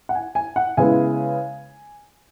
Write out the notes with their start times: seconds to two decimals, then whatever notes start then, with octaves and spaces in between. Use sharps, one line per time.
0.09 F#5
0.15 G#5
0.35 G#5
0.56 F#5
0.77 C#3 G#3 B3 E4 G#5